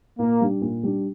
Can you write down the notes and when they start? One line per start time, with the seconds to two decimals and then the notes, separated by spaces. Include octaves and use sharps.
0.19 A#2 A#3
0.41 G3 D4
0.61 A#2
0.83 G3 D4